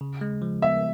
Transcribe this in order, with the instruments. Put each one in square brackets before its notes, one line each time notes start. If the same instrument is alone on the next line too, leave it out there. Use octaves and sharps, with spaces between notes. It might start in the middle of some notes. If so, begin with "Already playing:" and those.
[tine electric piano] C#3
G#3
F3
[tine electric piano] B3 [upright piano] E5